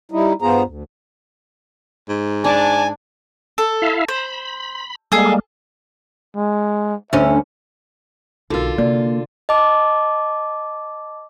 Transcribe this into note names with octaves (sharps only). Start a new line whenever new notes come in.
G3 D#4 E4
G2 B3 F4 G#4 C5 A#5
D2
G#2
D4 D5 G#5 A5
A4
E4 E5 F5
C5 B5
G3 G#3 A#3 G#4 A4
G#3
D2 C#4 E5
B1 D3 D#4 F4 F#4 A#4
C3 A#3 D5
D#5 A5 D6